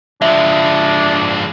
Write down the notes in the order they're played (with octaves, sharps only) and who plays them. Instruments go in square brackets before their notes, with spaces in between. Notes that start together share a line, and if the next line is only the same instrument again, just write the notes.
[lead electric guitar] F3 G#3 [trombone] D4 [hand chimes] E5